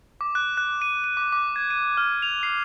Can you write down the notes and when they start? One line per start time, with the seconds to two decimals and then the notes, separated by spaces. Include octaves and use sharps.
0.21 D6
0.35 F#6
0.57 F#6
0.82 D#7
1.04 D#7
1.17 D6
1.33 D6
1.56 G#6
1.70 D#7
1.97 F6
2.22 F7
2.43 C7